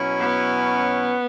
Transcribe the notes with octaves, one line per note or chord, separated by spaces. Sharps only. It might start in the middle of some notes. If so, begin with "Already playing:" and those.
Already playing: B2 F#3 C#4 E4
B3